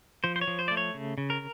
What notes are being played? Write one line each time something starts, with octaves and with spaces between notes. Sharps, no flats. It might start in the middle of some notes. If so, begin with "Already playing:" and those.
F3 C5
C5
C#5
F3
C5
A3 D5
C#5
C#3
C#3
A#4